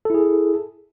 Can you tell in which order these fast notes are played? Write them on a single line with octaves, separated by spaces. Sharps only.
A4 E4 G#4